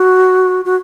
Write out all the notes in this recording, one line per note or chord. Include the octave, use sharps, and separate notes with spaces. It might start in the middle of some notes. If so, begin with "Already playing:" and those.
Already playing: F#4
F#4